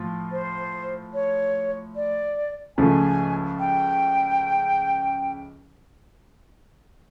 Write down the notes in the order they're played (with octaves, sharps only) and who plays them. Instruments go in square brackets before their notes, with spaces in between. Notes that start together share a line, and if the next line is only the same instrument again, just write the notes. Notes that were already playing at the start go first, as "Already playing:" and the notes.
Already playing: [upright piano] A2 F3 F4
[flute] C5
C#5
D5
[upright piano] C#2 C#3 F3 A3 [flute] G#5
[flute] G5